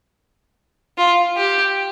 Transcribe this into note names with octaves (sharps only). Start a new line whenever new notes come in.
F4
G4